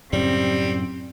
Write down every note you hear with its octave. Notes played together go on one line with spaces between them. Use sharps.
F#2 A2 C#3 G3 C4